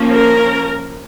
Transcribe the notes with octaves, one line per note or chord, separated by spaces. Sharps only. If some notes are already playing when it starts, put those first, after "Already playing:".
Already playing: F3 A#3 C#4
A#4